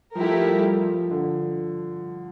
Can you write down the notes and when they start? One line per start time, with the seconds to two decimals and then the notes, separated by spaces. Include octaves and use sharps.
0.15 F3 A3 E4 G4 A#4
0.47 G3
0.79 F3
1.11 D3